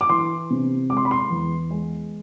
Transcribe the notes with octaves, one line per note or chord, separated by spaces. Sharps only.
D6
E3 C6
C3
G#3 D6
C6
B5
C6
E2
G#3